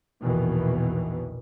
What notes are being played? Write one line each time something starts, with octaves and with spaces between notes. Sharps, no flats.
A#1 E2 B2 D#3 E3